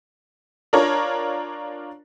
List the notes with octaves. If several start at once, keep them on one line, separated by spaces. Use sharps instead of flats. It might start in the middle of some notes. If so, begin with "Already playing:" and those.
D4 F4 A#4 C#5 A#5